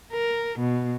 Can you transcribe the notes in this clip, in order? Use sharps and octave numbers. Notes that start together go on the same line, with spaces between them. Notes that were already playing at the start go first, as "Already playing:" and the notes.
A#4
B2